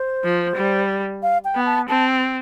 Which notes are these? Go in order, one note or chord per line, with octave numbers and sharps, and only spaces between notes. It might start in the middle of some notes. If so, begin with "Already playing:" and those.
Already playing: C5
F3
G3
F5
G5
B3
A5
C4 A5